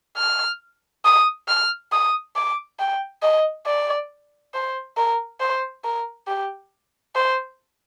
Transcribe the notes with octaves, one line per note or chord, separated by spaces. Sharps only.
F6
D#6
F6
D#6
D6
G5
D#5
D5
C5
A#4
C5
A#4
G4
C5